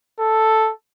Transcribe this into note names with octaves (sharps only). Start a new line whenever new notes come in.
A4